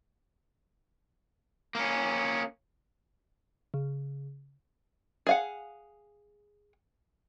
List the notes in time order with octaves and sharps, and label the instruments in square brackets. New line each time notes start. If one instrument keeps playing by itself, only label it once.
[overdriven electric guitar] A#3 C#4
[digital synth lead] C#3
[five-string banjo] G#4 F5 F#5